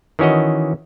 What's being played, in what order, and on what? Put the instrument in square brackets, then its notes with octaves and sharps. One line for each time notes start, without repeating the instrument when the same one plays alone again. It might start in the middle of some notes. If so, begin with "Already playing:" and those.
[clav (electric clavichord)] D#3 E3 C#4 F#4 D#5